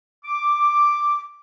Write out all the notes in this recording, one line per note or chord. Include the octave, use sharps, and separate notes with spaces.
D6